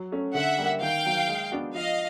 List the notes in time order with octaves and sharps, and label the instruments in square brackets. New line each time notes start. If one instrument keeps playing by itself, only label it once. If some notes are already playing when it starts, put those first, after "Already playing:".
Already playing: [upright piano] F#3
A3 C#4
[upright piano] D3 [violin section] E5 F#5
[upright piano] G3 A#3
[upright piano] D#3 [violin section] F5 G5
[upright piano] F#3 A#3
G#3
B3 D4 F#4
[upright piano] F3 [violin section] D#5 F5